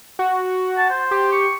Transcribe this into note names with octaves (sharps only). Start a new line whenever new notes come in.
F#4
A5
C5
G4
C#6